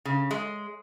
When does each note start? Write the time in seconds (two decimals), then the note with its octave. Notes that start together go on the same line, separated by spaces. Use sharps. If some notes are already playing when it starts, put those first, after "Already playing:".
0.05 C#3
0.31 G#3